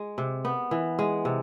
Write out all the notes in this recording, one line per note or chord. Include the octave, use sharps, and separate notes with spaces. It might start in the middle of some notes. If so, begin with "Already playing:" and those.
Already playing: G#3
C3
B3
E3
G#3
C3